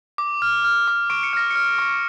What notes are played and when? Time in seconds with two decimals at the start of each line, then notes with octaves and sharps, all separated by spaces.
0.18 D6
0.42 F6
0.64 F6
0.88 D6
1.10 C#6 D7
1.23 C#7
1.33 F6 A#6
1.51 F6 C#7
1.78 C#6